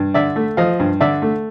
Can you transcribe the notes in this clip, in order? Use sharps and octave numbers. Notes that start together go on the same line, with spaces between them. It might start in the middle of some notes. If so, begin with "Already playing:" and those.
Already playing: G2
D3 D5 E5
A3
F3 D#5 F5
G2
D3 D5 E5
A3